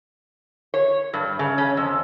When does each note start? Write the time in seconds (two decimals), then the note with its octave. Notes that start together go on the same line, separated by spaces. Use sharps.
0.74 C#5
1.14 G2
1.39 C#3
1.58 C#4
1.77 F2